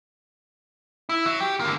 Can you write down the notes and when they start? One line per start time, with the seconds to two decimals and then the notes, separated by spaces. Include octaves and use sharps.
1.09 E4
1.26 F#3
1.40 G4
1.60 D3 A#3